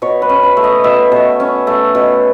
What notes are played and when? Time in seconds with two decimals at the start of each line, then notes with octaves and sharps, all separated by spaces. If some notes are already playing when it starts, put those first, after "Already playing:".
0.02 B2 C#5
0.22 B4
0.29 C#4
0.43 B4
0.57 A3
0.64 D#5
0.84 B2 E5
1.12 B2
1.40 C#4
1.67 A3
1.95 B2